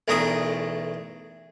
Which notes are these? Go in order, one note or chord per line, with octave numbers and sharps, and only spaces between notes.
B1 E2 A3 D4 A#4 D#6